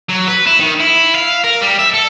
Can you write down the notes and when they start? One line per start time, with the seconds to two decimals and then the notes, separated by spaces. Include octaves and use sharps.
0.09 F#3
0.28 B4
0.47 E4
0.60 D#3
0.80 E4
1.15 F5
1.44 A#4
1.62 G3
1.79 E5
1.94 A4